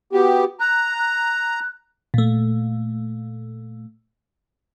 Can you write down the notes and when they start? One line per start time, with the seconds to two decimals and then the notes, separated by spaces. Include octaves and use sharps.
0.13 B3 F#4 G4
0.60 A#5 F#6
0.99 F#6
2.14 A#2 A3